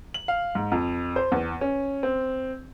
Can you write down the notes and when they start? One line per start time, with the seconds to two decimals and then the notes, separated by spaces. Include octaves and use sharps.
0.14 F#7
0.28 F5
0.55 G#2
0.72 F2
1.16 C5
1.32 E2
1.61 C#4
2.03 C4